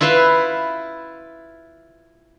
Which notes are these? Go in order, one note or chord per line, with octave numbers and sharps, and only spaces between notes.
E4 F4 B4 E5 F5